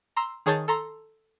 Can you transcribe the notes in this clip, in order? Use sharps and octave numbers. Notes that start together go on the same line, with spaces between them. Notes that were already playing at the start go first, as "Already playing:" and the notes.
A#5 C6 E6
D#3 G#4 C#5 A5 G6 A6
A4 A#5 C6